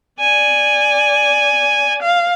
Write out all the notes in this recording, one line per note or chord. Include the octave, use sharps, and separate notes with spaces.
D5 G#5
F5